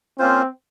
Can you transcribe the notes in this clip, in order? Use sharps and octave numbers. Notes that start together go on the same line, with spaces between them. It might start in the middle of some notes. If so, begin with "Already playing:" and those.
A#3 C4 C#4 F4 C5